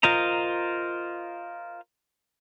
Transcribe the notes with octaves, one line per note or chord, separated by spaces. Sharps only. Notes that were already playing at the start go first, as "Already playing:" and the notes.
F4 A#4 C5 D#5 A#5